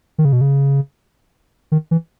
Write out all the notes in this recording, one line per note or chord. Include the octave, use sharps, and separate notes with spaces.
D#3
C#3
B2
C#3
D#3
E3